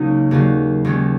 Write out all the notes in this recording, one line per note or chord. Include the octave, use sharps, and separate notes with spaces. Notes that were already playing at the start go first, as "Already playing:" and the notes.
Already playing: C#2 C#3 F#3 A#3 C#4 D#4
D#2 C#3 F#3
D#2 D#3 G#3 C#4